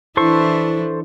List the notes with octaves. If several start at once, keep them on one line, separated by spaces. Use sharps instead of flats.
E3 D4 E4 A4 C5 C#6